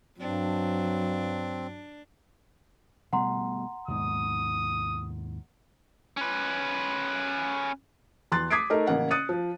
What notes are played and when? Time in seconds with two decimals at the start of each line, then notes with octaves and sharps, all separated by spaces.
0.20 G2 F#3 C4 D4
3.13 B2 G3 A3 F#5 A#5 C6
3.88 D#2 G#2 B2 D#6
6.17 C#4 B4
8.32 E2 C6 F#6 A6
8.51 D6 D#6 G#6 B6 C7 D7
8.70 A3 D#4 A#4 D#5
8.87 A1 C#3 A#3 F#5
9.11 D#6 F#6 A6 C#7 D#7
9.29 F3